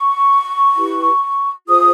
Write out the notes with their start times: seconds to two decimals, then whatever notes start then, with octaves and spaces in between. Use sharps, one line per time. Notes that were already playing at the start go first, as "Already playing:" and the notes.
Already playing: C#6
0.76 E4 G4 B4
1.67 F4 G#4 C5 D#6